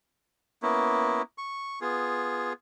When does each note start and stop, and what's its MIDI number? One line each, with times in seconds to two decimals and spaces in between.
0.63 1.22 58
0.63 1.22 59
0.63 1.22 61
0.63 1.22 64
1.38 1.79 85
1.81 2.53 59
1.81 2.53 65
1.81 2.53 68